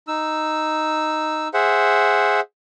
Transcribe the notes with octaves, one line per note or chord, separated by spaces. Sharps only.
D#4 E6
G#4 C5 E5 F#5